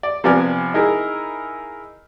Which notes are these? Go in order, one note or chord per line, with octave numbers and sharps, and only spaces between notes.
D5
C3 F3 B3 D5 G#5 F6
D#4 E4 G#4 A#4